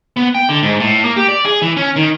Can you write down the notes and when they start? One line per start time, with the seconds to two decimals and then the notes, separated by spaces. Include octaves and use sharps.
0.17 B3
0.35 G5
0.49 D3
0.63 G#2
0.80 A2
1.04 A#3
1.16 G4
1.28 D5
1.45 G#4
1.62 E3
1.77 C#4
1.96 D#3